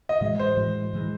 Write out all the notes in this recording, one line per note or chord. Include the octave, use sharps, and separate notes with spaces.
D#5
A2 E3 G#3 D#5
C5
A2 E3 G#3
A2 E3 G#3